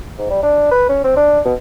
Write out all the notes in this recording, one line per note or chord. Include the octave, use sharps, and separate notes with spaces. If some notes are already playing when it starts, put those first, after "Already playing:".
G#2
G3
D4
B4
C#4
C4
D4
B2